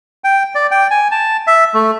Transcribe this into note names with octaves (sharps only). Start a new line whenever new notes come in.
G5
D5
G5
G#5
A5
E5
A3